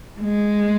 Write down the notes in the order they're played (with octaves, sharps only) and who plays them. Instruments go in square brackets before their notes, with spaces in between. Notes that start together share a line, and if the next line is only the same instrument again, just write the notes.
[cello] G#3